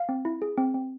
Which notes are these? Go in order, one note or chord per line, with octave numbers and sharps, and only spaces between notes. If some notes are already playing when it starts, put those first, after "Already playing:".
Already playing: F5
C4
E4
G#4
C4
C4